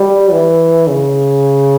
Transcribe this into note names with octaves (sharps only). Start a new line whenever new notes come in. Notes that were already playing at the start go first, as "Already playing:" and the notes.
Already playing: G3
E3
C#3